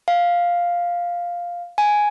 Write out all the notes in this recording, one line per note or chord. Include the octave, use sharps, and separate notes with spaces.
F5
G#5